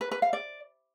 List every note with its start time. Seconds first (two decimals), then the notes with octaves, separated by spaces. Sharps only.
0.01 B4
0.11 B4
0.22 F5
0.33 D5